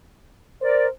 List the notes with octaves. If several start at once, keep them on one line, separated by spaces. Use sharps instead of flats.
A#4 C5 D5